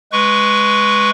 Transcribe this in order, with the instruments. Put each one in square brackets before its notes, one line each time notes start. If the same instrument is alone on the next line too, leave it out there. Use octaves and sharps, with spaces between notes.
[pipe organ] G#3 B4 C#6